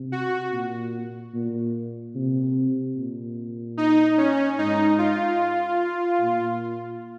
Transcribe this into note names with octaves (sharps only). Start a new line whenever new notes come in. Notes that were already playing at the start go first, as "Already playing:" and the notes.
Already playing: C3
F#4
A#2
A#2
C3
A#2
D#4
C#4
G#2 D#4
F4
A#2